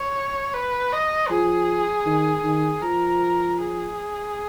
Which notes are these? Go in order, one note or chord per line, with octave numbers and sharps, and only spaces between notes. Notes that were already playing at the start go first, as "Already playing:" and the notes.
Already playing: C#5
B4
D#5
F3 G#4
D#3
D#3
F3 A#4
G#4